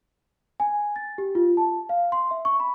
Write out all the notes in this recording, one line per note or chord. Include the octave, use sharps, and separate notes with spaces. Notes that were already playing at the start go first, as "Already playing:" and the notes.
G#5
A6
G4
F4
A5
F5
C6
E5
C#6
B5